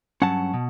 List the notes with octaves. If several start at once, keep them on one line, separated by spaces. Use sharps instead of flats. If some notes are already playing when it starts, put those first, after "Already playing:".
G2 F#3 C#4 F#5 A5
B2